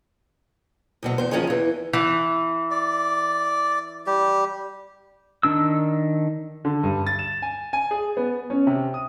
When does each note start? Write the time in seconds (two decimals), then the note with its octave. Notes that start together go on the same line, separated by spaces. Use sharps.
1.03 D2 B2 F#3
1.18 E2 C5
1.31 D#3 F3 G3 C#4 G#4 C#5
1.47 E2 E3
1.93 E3
2.71 D5
4.07 G3 G4
5.43 D#3 D4 E6
6.65 D3
6.83 G2
7.07 A6
7.19 E7
7.42 G#5
7.73 G#5
7.91 G#4
8.17 B3
8.50 C#4
8.67 C3
8.94 D#6